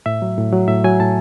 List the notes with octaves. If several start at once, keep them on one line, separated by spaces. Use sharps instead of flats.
A2 E5
F#3
A2
F#3
A2 E5
F#3 G#5
A2 A5